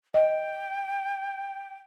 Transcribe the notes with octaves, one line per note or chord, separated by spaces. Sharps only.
D#5 G5